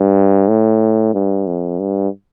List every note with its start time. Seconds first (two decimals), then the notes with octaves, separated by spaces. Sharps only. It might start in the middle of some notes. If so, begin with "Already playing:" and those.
Already playing: G2
0.48 A2
1.14 G2
1.47 F2
1.79 G2